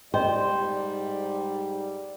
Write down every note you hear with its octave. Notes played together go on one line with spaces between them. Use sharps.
G#2 G3 D#4 C5 D5 D#5 G5